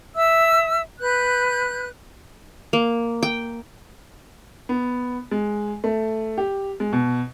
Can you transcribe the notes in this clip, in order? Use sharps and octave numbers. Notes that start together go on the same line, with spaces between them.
E5 E6
B4 F#6 G6
A#3
G5
B3
G#3
A3
G4
G#3
B2